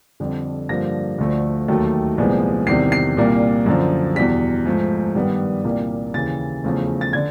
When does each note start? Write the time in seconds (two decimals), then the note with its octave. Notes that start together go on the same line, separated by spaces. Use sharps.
0.20 F2 D3 G3
0.69 G2 D3 F3 A#3 A#6
1.18 D2 D3 F3 A3
1.68 D#2 D#3 F#3 A3
2.18 C2 A#2 F3 G#3 B3
2.67 E2 C3 D#3 G3 C7
2.92 C7
3.17 C2 A#2 G3 A#3
3.66 F#2 D3 F3
4.15 E2 B2 G3 B6
4.66 G#2 F3 A3
5.15 G2 D#3 G3 B3
5.64 C2 A#2 G3 A#3
6.14 D#2 C#3 E3 A6
6.64 E2 C#3 F3 A3
7.01 A6
7.13 D3 G#6